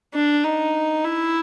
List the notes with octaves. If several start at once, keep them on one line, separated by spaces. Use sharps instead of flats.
D4
D#4
E4